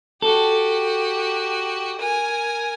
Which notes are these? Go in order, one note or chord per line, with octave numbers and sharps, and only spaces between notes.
F#4 G4 A4
A#4 G#5